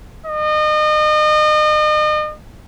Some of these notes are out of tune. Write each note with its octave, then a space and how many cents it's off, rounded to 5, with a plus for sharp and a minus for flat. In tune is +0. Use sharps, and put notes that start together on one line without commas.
D#5 -35